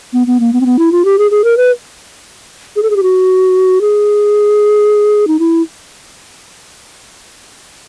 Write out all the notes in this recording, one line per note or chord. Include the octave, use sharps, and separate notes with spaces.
B3
B3
A#3
B3
C4
B3
E4
F4
G4
G#4
G#4
A#4
B4
G#4
A4
G#4
G4
F#4
G#4
D#4
E4